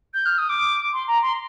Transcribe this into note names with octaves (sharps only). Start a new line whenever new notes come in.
G6
F6
D#6
D6
C6
A#5
C6